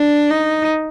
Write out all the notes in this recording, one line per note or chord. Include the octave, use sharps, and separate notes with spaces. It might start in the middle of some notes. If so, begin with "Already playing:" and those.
Already playing: D4
D#4